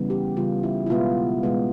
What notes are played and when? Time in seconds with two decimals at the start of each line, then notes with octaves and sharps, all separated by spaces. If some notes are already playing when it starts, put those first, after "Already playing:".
Already playing: C#3 E3 G3 B3
0.10 G4
0.37 C#3 E3 G3 B3 F4
0.63 E4
0.86 E4
0.90 B2 G#3 B3 F4
1.43 B2 G#3 B3